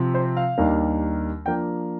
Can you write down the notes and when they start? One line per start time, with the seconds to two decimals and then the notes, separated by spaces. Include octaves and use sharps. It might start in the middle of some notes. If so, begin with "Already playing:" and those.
Already playing: C3 F3 C4
0.14 C5
0.37 F5
0.58 D#2 D#3 G3 A#3 D4
1.46 F3 A#3 D4 G5